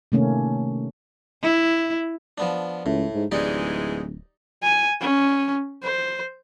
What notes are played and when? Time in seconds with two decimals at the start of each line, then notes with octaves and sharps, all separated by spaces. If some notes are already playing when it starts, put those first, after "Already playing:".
0.12 C3 D#3 A3 A#3 C#4
1.42 E4
2.38 F3 B3 D4
2.86 C#2 A2
3.15 G#2
3.32 D1 G#2 E3 G#3 D#4 G4 D5
4.63 G#5
5.01 C#4
5.83 C5